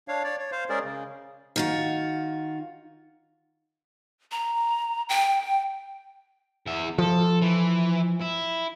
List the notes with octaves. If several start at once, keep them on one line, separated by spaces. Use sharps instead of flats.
D4 C#5 F5
C#5 D5
C#5
C5 F5
G#3 C#4 G#4 A#4 D5
C#3
D#3 F4 F#4
A#5
G5
E2 E5
F3 A4
E3
E4